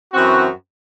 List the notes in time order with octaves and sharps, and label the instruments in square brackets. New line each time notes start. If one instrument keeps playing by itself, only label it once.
[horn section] F#2 E3 C4 F#4